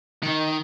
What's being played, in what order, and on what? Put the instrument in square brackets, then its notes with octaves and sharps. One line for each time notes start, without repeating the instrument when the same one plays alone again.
[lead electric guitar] D#3